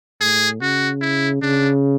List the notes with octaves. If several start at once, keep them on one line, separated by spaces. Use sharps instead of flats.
A2 G#4
C#3 F#4
E4
C#3 D4